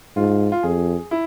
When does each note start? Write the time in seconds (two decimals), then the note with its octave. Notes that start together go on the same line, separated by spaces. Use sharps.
0.16 G#2 F4
0.52 F4
0.63 F2 G#4
1.11 E4